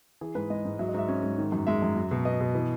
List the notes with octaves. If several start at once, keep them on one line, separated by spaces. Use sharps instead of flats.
E3 G#4
G#2 B4
G#3 D#5
G#2
F#3 E5
D#5
G#2 E5
C#4
G#2
D#3
F#2
G#3 E5
F#2
F#3
B2
B3 D#5
B2
E3